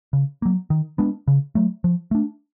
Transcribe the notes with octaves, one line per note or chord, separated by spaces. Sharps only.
C#3
F#3 A#3
D#3
G#3 B3 D4
C#3
F#3 A3
F3
A3 D4